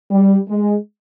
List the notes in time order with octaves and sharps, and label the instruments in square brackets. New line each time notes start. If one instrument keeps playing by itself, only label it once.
[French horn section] G3
G#3